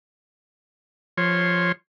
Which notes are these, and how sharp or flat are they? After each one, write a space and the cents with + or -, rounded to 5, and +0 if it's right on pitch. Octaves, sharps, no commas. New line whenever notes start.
F3 +0 C#5 -15 C6 +0